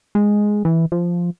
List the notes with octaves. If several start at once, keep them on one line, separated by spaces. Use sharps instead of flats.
G#3
E3
F3